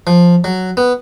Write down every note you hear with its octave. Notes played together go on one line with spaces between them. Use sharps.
F3
F#3
B3